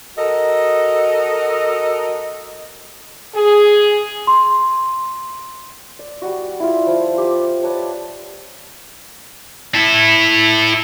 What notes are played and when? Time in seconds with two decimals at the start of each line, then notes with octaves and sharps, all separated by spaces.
0.18 F#4 A4 A#4 D#5
3.35 G#4
4.27 C6
5.99 D5
6.22 G3 F#4
6.60 E4 F4
6.87 F3 C5
7.18 G4
7.63 B4 C#5 D5 A5
9.75 E4 A4